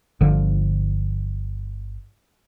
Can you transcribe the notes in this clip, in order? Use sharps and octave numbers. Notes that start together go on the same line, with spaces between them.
G1 D3 F3